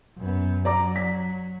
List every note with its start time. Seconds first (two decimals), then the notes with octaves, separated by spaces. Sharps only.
0.18 F#2 B3
0.65 F#3 D5 A#5 D6
0.96 B6